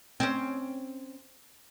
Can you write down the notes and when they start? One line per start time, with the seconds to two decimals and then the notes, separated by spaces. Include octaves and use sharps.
0.20 C4 C#4